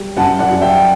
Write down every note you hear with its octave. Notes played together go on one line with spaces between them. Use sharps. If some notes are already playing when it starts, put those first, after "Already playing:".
Already playing: G3
F#2 F#5 A5
D5 F#5
F#2
E5 G5